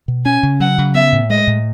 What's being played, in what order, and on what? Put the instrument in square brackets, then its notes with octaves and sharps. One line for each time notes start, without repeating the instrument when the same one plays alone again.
[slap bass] B2
[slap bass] C#4 [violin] G#5
[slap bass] C#3
[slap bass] F#3 [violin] F#5
[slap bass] C#3
[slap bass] B3 [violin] E5
[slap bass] A2
[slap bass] G#3 [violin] D#5
[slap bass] A2